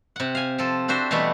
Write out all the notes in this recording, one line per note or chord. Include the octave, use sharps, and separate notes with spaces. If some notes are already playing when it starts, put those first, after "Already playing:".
C3 F#5
F5 G#5
F3 A4
C4 D4 F#4 C5 E5
B2 E3 G3 A3 B3